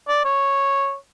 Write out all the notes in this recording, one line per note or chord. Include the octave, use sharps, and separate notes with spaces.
D5
C#5